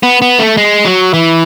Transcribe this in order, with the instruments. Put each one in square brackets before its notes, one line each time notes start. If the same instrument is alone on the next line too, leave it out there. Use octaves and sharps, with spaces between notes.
[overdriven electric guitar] B3
B3
A3
G#3
F#3
E3